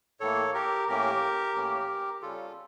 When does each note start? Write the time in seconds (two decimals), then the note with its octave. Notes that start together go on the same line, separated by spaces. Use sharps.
0.20 A2 E3 A#3 A4 C#5
0.54 G4 A#4
0.88 A2 E3 A#3 C#4 G4 A#4
1.55 A2 E3 A#3 C#4
2.22 C#3 G3 C#4 F4 A4